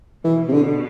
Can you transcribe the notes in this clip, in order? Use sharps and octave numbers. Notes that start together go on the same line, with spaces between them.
B2 E3
C3
D3